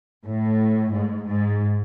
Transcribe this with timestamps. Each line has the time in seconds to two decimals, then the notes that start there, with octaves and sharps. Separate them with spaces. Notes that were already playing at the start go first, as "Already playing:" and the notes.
0.24 A2
0.92 G#2
1.27 G#2